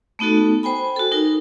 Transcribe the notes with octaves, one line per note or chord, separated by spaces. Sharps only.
A3 B3 D#4 F#4 A4
C5 G5 G#5 B5
F#4 A4
D#4 A#4